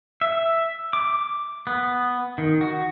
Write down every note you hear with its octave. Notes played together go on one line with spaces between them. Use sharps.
E5
D6
B3
D#3
F#4